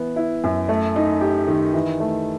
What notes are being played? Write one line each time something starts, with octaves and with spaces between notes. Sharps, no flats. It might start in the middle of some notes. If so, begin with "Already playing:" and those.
Already playing: E3 B3
E4
F#2
A3
D#4
G4
D#3
E3
A3